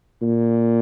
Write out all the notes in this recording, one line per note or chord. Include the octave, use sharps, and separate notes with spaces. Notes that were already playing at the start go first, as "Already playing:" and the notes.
A#2